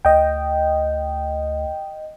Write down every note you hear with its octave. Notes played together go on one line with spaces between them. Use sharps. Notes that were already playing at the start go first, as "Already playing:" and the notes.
D2 D#5 G5